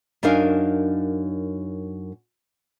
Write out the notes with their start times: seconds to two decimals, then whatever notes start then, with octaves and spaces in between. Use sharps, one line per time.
0.23 F#2 D4 D#4 A#4 F5 G#5